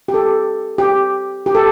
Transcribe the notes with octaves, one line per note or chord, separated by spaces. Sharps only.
G4
A4
G4
G4
A4